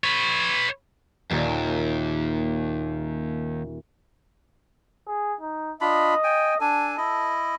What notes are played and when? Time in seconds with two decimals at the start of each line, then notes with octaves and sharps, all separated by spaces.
0.04 B4 C#5
1.31 D#1 D#2 A#3 G4
5.07 G#4
5.41 D#4
5.81 D4 F4 D#5 B5
6.24 G5 G#5
6.61 D4 A4 G#5
6.97 E4 D#5